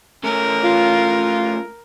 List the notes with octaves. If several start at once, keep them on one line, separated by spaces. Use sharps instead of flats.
A3 C#4 A#4
F4